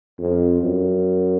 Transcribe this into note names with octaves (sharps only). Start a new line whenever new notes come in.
F2
F#2